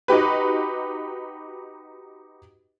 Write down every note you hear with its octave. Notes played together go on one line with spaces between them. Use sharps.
D#4 F#4 G4 B4